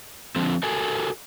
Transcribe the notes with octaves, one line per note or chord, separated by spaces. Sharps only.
D3 F3 C4
F#4 A4 A#4 G#5